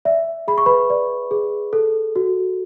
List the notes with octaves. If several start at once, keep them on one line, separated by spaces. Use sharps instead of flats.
D5 E5
G#4 B5
C#6
B4 B5
D5
G#4
A4
F#4